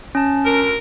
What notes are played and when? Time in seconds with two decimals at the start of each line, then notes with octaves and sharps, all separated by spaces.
0.15 C#4 A5
0.45 D2 A#4